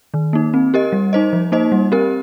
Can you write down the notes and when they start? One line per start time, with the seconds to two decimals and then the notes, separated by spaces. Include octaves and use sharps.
0.14 D#3
0.33 A#3 D#4
0.54 C4
0.74 G4 A#4 D#5
0.92 G3
1.13 D#4 C5 D#5
1.33 F3
1.52 A#3 D#4 C5 D#5
1.72 G3
1.92 C4 G4 A#4